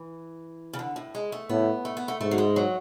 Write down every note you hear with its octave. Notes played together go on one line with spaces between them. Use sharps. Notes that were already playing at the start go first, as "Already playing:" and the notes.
Already playing: E3
C#3
D3
A2
G#3
A3
A2 B3
A3
B3
A3
G#2 A3
F#3
G#3
F#3